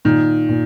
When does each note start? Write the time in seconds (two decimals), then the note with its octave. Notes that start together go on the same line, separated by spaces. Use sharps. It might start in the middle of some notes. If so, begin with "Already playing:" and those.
0.05 A#2 D#3
0.49 A#2